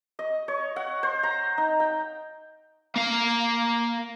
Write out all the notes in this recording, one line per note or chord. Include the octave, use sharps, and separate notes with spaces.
D#5
C#5
F#5
C5
A#5
D#4
G5
A#3 F5